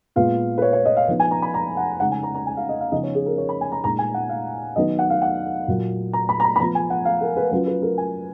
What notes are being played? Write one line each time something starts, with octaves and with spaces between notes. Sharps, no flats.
A#2 G#3 B3 F4 F5
B4
C#5
C#5
D#5
F5
F3 B3 D#4
G#5
A#5
B5
A#5
F#5
C#3 G#3 D#4 F#5
G#5
A#5
A#5
G#5
F5
D#5
F5
C#3 F3 B3 D#4 D#5
C#5
G#4
A#4
C#5
B5
G#5
A#5
A#2 G#3 D#4 A#5
G#5
F#5
F5
D#3 F#3 B3 D#4 D#5
F#5
F5
F#5
A#2 F#3 A#3
A#5
B5
A#5
B5
B5
F3 B3 F4 A#5
G#5
F#5
F5
A#4
B4
F#3 C#4 F4 B4
B4
A#4
G#5